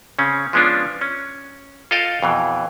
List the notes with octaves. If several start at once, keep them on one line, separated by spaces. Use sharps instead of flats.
C#3 C4 C#4
F3 G#3 B3 C#4 D4 F4
C#4
F4 A4 D#5 F5 G5
F2 B2 E3